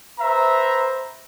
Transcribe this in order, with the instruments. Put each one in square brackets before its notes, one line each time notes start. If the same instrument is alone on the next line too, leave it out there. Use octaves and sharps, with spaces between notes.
[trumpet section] B4 C5 E5 A#5